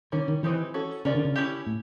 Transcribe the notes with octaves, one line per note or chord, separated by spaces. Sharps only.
D#3 G3 A#3 C#4
D#3
E3 G#3 C4 D#4 G4
C#4 F#4 A4
C#3 C#4 F4 A#4 D5
D3
C#3
C#4 E4 G4
A2